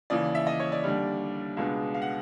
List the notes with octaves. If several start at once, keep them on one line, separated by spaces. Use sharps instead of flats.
D#2 C#3 E3 D5
E5
D#5
C#5
D5
D#2 D3 G3
C#2 B2 G#3 B3 D4
F5
F#5